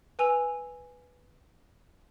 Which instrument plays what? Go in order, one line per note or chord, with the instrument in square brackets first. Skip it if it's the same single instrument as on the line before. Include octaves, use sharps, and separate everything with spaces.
[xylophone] B4 G#5 E6 F7